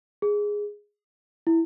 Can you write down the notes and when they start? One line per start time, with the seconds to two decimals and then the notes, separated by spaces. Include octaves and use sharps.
0.22 G#4
1.47 E4